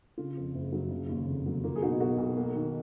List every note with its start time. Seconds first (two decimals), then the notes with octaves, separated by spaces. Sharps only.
0.18 C#3 F4
0.37 F2
0.54 F#1
0.73 F#3
0.91 C#3
1.09 D#2
1.27 F1
1.46 F#3
1.64 A#3 F4
1.76 G#4
1.82 B2 D#4 F#4
2.00 B1 F#4 A#4
2.18 B1
2.37 A#3
2.55 D#3